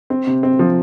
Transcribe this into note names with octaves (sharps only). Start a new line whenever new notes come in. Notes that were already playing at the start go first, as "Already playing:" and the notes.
C4
C3
C4
F3